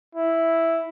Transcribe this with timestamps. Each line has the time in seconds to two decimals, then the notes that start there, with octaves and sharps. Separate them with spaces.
0.15 E4